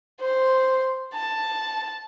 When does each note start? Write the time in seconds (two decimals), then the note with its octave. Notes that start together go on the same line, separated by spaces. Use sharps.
0.21 C5
1.14 A5